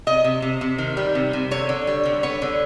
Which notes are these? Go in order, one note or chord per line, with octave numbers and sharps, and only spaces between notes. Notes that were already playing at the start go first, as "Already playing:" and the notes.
C3 D#5
C3
C3
C3
D#3
G3
C3
C3
D3 C#5
D3
G3
D3
B3 C#5
D3